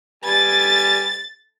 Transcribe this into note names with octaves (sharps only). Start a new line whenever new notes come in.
G3 B4 G#5 A6